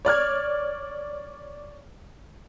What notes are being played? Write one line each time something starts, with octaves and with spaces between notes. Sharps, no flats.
C#5 D5 F6 G#6